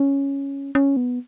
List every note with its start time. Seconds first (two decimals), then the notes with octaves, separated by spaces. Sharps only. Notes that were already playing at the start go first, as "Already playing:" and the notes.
Already playing: C#4
0.75 C#4
0.97 B3